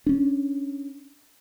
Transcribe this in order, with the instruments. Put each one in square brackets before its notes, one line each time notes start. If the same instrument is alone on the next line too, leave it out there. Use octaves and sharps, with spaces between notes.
[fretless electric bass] C#4 D4